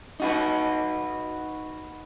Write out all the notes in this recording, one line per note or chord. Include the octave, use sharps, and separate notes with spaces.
D#4 F#4 B4